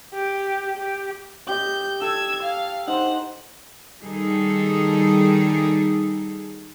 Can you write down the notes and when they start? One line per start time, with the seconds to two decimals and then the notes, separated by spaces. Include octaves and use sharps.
0.14 G4
0.78 G4
1.49 G4 D#5 G6
2.01 A4 E6 G#6
2.43 F5
2.88 D#4 C5 F#5
4.03 D#3 G3 D#4 G#4 A4